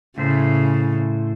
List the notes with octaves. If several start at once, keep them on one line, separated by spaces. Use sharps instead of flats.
A2 C#3 A3 C5